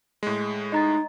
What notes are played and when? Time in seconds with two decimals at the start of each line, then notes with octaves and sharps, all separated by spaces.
0.23 A2 G#3
0.72 D#4 D#5 A#5 A6